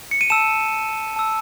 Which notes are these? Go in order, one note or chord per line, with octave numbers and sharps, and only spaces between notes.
C#7
D#7
A5 E6 E7
A5 E6